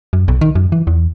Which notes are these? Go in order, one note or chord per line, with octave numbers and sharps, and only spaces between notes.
F#2
B1
D#3
F#2
E3
E2